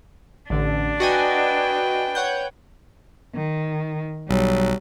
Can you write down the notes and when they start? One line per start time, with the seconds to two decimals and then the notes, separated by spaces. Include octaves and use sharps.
0.50 A1 D3 D4
1.00 F#4 B4 D#5 G5 G#5
2.15 C#5 F#5 G6
3.36 D#3
4.29 B1 F#3 G3